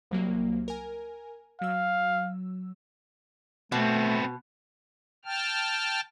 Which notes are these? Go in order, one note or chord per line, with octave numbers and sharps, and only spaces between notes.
C2 F#3 A#3
A#4 G#5
F#3 F5 E6
B2 A3 B3 C4
G5 A5 F6